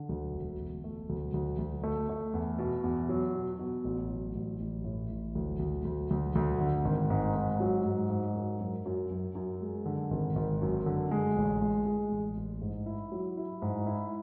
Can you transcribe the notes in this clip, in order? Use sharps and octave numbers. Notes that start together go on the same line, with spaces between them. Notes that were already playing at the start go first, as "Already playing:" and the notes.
Already playing: D3
D2
E1
E1
A3
D2
D2
D2
A3
A3
E2
B2
E2
F#3
B2
B2
A1
F#3
A1
A1
A2
A1
D2
D2
D2
D2
D2
D3
G#1
G#2
G#2
F#3
G#2
G#2
F#2
F#2
F#2
F#2
F#2
G#3
D3
G#1
G#1
F#2
D3
G#3
A1
G#3
G#3
A1
A1
G#2
E4
F#3
E4
G#2
E4